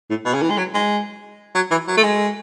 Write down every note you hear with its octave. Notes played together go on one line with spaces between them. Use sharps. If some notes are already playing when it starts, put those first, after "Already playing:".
A2
B2
C#3
E3
G#3
F#3
G#3
F#3
E3
F#3
A3
G#3